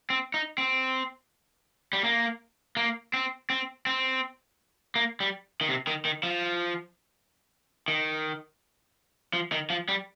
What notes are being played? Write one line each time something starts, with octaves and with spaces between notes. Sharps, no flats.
C4
D#4
C4
G3
A#3
A#3
C4
C4
C4
A#3
G3
D#3
C3
D#3
D#3
F3
D#3
F3
D#3
F3
G3